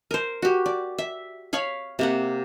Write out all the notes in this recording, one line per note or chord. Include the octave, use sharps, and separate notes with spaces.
A#4 C5
F#4 G4
D5
E5
C#5 F5 B5 C#6
C3 A#3 F#5